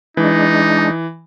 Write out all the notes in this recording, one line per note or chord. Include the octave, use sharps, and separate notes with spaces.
E3 G#3 D4 D#4